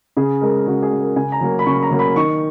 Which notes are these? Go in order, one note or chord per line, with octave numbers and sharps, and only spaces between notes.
C#3 G#4
G#3 A#4
C#3 F#4
G#4
G#3
A#4
C#3 G#5
A#5
F#3 A#3
B5
C#3 C#6
A#5
F#3 A#3
B5
D#3 C#6